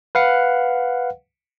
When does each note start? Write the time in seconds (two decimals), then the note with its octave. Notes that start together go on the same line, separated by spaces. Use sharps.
0.15 B4 F5 F#5